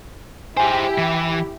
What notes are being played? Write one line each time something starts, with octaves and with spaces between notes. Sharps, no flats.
E4 G4 G#4 C5 G#5
E3